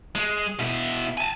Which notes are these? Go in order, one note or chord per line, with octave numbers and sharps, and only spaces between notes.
G#3
B2 E4
G#5 A5